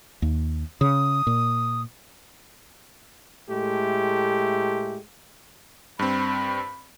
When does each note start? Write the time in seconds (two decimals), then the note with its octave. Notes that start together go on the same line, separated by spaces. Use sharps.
0.22 D#2
0.81 C#3 D#6
1.27 A#2
3.50 A2 G#3 A3 G4
5.99 G2 C4 B5